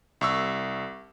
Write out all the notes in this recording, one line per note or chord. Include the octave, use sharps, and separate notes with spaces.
C2 C#6 E6